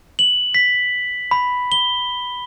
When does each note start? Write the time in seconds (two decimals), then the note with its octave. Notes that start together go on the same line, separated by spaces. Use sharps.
0.19 F#7
0.55 B6
1.31 B5
1.72 G7